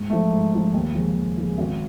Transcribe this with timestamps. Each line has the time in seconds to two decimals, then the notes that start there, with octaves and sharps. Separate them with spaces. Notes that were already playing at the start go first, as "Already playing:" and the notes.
Already playing: G#2
0.10 F3 A3
0.31 G#2
0.52 F3 A3
0.73 D#2
0.95 C#3 F3 G#3
1.15 D#2
1.37 C#3 F3 G#3
1.58 G#1